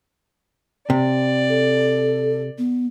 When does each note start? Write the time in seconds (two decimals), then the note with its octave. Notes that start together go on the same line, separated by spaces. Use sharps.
0.90 C3 D5
1.49 A4
2.58 B3